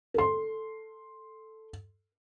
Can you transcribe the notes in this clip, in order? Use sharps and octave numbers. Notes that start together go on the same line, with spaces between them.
A4 C6